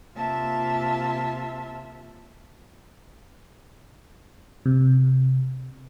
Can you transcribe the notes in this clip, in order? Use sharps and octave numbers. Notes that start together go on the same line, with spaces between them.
C3 A#3 F4 E5 A5
C3